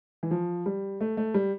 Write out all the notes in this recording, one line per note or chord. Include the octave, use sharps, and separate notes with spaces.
E3
F3
G3
A3
A3
G3